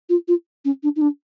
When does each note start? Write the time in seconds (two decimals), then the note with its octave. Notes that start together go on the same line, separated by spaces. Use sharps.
0.09 F4
0.28 F4
0.64 C#4
0.83 D4
0.96 D#4
1.01 D4